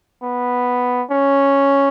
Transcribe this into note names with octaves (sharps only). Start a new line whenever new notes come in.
B3
C#4